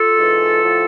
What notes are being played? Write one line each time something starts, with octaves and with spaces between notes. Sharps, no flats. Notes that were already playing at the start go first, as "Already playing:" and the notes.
Already playing: F4 A4
G#2 E3
A2 F3